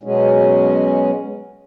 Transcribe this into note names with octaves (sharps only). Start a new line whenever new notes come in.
B2 F#3 G#3 C#4